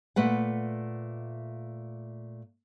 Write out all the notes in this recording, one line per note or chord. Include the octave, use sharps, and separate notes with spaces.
A#2 A3 B4 F#5